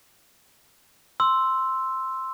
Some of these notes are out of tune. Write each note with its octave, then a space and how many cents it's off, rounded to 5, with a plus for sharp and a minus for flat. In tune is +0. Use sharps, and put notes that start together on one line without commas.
C6 +0 E6 +0